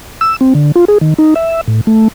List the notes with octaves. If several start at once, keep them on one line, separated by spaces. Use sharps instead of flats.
E6
C4
D3
F4
G#4
D#3
D#4
E5
A2
A3